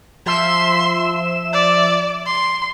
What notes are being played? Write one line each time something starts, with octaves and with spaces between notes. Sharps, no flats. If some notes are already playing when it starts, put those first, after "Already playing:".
F3 E5 C6 E7
D5
C6